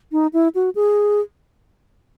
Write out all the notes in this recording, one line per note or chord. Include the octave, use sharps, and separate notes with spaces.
D#4
E4
F#4
G#4